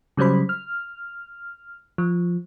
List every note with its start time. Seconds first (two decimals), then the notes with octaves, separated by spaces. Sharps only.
0.17 C#3 F#3 G3 C5 B5
0.49 F6
1.98 F3